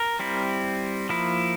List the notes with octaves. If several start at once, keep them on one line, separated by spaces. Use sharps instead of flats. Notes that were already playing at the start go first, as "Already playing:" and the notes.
Already playing: A#4
G3 C4 E4
F3 A#3 E4